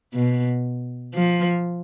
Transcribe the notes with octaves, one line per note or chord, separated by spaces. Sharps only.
B2
F3